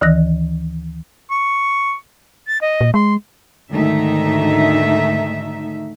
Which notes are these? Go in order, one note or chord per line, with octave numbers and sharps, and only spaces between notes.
D2 D#3 E3 F#6 A#6
C#6
A6
D#5
A#2
G#3 C6
D2 G#2 D#3 A3 D#4 E5